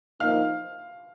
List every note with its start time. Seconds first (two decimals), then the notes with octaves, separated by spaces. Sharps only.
0.20 F3 A#3 D#4 F5 F6